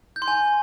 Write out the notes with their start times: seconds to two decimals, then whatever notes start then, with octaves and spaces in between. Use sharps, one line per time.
0.16 G6
0.22 C6
0.28 G#5